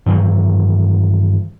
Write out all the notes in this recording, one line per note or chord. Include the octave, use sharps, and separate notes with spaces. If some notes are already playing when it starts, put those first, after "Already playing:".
G2 D#3 E3 F#3